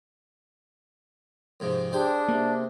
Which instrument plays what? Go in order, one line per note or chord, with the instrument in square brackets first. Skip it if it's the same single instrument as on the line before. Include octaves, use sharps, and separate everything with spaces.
[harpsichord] F2 G#2 C3
[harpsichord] G#3 C5 [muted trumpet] D4 [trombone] G4
[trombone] C3 [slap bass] A#3